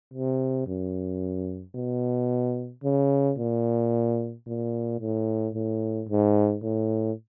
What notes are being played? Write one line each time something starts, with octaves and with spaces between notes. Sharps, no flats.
C3
F#2
B2
C#3
A#2
A#2
A2
A2
G#2
A2